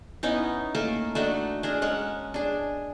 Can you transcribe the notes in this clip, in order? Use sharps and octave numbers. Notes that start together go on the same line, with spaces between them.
B3 C#4 D#4 E4
A3 A#3 A4 A#4
A3 D4 D#4 F#4
D4 G#4 A#4 A#5
G#3 C#4 F#5
D4 G#4